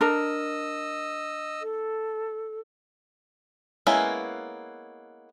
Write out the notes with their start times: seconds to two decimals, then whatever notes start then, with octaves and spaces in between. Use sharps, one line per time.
0.01 D4 A#4 D#5 E6
1.62 A4
3.87 G#3 A#3 B3 C#4 E4